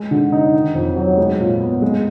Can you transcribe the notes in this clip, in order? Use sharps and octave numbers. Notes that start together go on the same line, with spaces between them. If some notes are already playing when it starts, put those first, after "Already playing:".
Already playing: G#3
D3
D#4
D#3
F2
F#3
G#3
A#2
B3
G#3